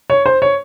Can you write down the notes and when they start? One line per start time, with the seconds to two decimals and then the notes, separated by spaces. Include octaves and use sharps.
0.10 C#5
0.26 C5
0.42 C#5